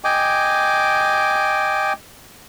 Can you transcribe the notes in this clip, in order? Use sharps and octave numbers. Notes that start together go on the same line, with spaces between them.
D#5 G5 G#5 D6